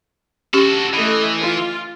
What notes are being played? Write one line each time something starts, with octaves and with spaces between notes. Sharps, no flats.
C#4 F#4 G4 A4 C#6
E3 A3 D#5
F4